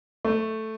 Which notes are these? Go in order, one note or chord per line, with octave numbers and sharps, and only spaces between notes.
A3